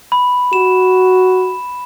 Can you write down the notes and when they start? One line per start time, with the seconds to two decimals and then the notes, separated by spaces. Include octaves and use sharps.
0.12 B5
0.53 F#4 E7